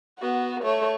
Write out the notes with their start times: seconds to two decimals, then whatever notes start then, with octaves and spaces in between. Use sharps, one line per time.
0.19 B3 F#4
0.63 A3 C#5